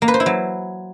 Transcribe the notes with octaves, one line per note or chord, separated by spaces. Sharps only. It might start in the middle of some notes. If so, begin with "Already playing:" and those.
A#3
B4
C5
E4
F#3